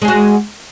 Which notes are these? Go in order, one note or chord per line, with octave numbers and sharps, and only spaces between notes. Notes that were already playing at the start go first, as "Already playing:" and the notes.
G#3 F#4 G#4